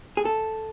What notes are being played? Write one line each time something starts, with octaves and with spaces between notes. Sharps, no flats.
G#4
A4